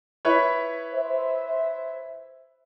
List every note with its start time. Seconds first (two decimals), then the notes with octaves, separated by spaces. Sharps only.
0.25 E4 B4 C#5
0.95 C5 E5